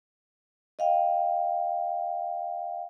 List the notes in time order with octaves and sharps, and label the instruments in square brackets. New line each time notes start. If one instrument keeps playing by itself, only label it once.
[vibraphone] D#5 F5 G5